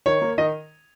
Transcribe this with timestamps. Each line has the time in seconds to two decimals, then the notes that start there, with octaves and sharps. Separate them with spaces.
0.06 D#3 C#5
0.22 A#3
0.38 D#3 D#5